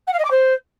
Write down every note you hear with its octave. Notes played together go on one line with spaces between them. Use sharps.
F#5
F5
D#5
D6
C5